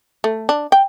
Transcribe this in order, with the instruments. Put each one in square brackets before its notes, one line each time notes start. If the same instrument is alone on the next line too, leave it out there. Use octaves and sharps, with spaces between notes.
[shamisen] A3
D4
G5